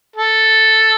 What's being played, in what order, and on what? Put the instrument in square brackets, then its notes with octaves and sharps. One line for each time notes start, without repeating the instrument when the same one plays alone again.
[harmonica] A4